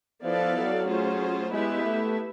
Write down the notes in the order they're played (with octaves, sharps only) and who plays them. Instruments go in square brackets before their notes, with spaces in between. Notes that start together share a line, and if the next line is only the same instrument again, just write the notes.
[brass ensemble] F3 [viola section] B3 E4 A4 D5 F5
[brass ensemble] F#3
[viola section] A3 C#4 F4 G#4 C5
[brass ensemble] G#3 [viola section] B3 E4 G4 B4 E5
[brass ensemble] A3